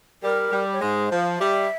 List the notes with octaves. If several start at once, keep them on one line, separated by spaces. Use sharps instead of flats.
G3 A#4
G3
C#5
G#2 G#3 C5
F3
F5
G3 E5